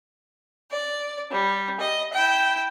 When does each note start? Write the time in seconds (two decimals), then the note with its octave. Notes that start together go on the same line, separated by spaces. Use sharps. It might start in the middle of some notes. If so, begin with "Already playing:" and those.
0.70 D5
1.30 G3
1.80 D#5
2.13 E4 G5